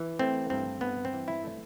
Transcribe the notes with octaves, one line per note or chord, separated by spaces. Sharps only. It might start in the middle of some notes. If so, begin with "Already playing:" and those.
Already playing: E3
A3 C4
G2 C4
G2 B3
C4
E3
E4
A3